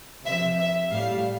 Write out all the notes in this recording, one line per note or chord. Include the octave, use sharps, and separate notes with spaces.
C3 F3 E5
E5
A2 G3 F5